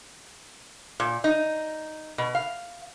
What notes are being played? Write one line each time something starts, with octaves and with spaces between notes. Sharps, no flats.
A#2
D#4
B2
F5